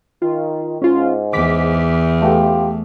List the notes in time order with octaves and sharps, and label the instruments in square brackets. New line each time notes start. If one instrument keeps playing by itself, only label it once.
[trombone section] D#3 [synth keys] F4
[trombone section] G#2 [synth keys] C#4 F4
[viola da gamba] E2 [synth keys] D6 B6
[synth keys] A3 [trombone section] B3 F4 G4